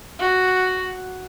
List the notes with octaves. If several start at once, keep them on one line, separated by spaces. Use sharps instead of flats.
F#4